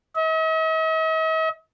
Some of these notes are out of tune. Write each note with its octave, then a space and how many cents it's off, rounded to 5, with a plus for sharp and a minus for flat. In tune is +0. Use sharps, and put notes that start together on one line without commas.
D#5 +45